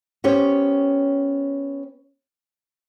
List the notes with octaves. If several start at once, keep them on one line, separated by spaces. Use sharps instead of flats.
B3 C#4 G4 C5 C#5